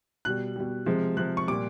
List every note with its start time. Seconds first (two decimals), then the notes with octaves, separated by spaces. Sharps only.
0.25 B2 G3 F#6
0.56 B2 G3
0.86 C3 F3 G#3
1.17 C3 F3 G#3 F#6
1.37 C#6
1.47 A#2 G3 D6